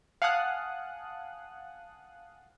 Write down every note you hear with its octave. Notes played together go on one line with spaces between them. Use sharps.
F5 F#5 G#5 A5 D#6 F#6